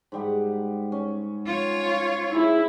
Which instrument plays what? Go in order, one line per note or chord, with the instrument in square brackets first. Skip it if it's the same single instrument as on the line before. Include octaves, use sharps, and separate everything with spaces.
[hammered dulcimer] G#2 G3 F#5
C#4
[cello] F4 C#5
[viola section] E4 [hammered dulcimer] G#4